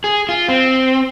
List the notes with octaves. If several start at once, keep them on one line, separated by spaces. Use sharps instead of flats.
G#4
F4
C4